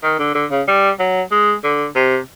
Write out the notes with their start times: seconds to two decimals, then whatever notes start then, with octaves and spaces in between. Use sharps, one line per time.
0.03 D#3
0.19 D3
0.35 D3
0.51 C#3
0.68 G3
0.99 F#3
1.31 G#3
1.64 D3
1.95 C3